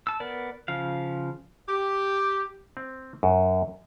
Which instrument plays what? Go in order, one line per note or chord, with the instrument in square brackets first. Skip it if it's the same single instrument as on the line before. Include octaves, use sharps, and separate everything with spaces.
[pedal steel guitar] A5 E6
B3 A#4 D5
C#3 F3 F5
[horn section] G4
[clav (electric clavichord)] C4
F#2